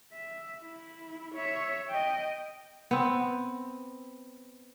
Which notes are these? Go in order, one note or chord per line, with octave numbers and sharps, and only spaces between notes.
E5
E4
C#5 E5
D#5 G5
B3 C4